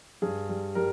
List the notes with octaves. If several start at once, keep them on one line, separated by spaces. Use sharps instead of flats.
G2 G#4
G3
G3 A#4